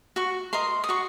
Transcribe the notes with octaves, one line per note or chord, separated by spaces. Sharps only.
F#4 C#6
A#4 D#5 C6
D#6
F#4 C#6